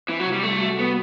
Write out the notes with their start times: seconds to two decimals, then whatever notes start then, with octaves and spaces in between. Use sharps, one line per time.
0.08 E3 C4
0.20 F#3
0.25 C3
0.32 G3
0.43 G3 A3
0.60 F#4
0.78 B3 A4